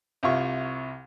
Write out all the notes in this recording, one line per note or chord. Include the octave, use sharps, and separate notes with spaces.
C2 C3 F4 C#6